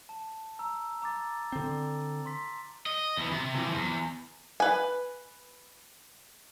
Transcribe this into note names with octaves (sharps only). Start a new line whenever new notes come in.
A5
A#5 E6
A#5 D6 A6
D3 C4
C6 B6
D#5
E2 E3
C3
E3 F3
E2
B4 G#5